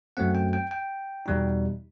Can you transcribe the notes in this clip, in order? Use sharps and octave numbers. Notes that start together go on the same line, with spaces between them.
F#2 F#3 A3 C4 F#5
G5
G5
G5
E2 B2 G3 D#4